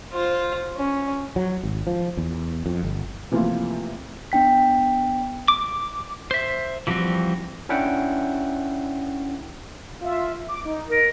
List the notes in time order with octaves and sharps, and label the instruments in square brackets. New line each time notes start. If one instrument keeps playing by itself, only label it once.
[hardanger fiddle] F4 C5
C#4
[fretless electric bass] F#3
G#1
F3
E2
F2
G1
[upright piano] C3 E3 F3 A3 A#3 F4
[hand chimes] B3 D4 G5 B6
[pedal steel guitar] D6
C5 E5
E3 F3 G3 C4 F#4
[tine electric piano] C#4 D4 E4 E5 F#5 G5
[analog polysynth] F4 E5
D6
D#4
[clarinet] A#4